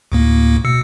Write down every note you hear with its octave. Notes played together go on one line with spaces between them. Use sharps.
D2 A2 A#3
B2 E6 C#7